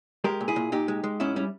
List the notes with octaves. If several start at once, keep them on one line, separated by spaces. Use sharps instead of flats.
G#3 G4 A#4
A#2
E4 G#4
A#2
A#2 D#4 G4
G#3
G#3
G#2 C#4 E4
G3 C#4